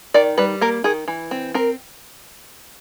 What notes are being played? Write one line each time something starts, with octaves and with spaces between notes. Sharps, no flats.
D#3 D5
G3 B4
A#3 A#4
D#3 G#4
E3
C4
C4 A#4